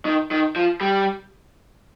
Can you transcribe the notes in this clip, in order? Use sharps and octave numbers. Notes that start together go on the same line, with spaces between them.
D#3
D#3
F3
G3